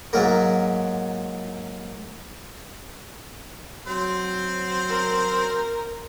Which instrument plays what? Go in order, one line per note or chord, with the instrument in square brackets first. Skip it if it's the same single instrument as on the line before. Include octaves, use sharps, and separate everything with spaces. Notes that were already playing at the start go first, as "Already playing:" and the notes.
[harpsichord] G#2 F#3 A#3
[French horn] F#3 [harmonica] C4 C5
[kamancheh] A#4